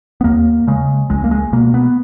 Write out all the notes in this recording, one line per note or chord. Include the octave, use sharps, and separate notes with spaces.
B3
D#2 A#3
C#3 G#3
C#2 G#3
A#3
G#3
B2 A#3
B3